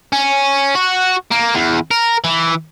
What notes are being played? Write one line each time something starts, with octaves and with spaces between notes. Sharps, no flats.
C#4
F#4
A#3
E2
A#4
E3